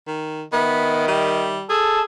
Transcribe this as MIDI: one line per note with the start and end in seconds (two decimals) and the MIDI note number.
0.07 0.43 51
0.53 1.61 51
0.53 1.06 59
0.53 1.55 76
1.08 1.68 55
1.70 2.03 68
1.70 2.01 69
1.70 2.00 81